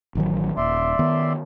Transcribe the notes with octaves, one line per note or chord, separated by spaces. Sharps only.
A1 D#3 F#3
D#1 D5 E5 C6
D#3 B3